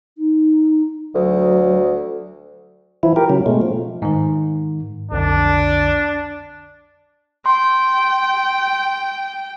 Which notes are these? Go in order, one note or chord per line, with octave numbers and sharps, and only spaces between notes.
D#4
D2 F#3
E3 F3 E4
G4 A#4
C#3 F#3
B2 G#3 A3
F3
G#2 D#3
B1 F2 D3 D4
G5 C6